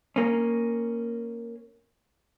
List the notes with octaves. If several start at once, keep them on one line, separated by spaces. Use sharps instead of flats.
A#3 C#4